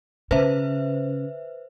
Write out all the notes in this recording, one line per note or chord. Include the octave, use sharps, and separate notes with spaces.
C#3 B4 C5 E5